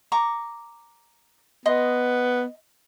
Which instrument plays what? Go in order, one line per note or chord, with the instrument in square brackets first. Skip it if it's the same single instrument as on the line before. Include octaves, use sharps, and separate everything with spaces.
[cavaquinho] A#5 C#6 D6
[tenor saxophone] B3 [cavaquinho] D#5 C6